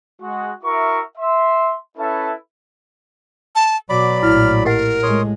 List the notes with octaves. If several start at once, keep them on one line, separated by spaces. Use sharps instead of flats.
G#3 F#4
E4 F#4 A#4 E5 C#6
E5 C6
C#4 E4 A4 B4 E5 A5
A5
B2 F#3 D5 B5 D6
A#1 A2 E4 F6
G4 A#4 D#5 F#5
A2 G#3 C#5 C6 D#6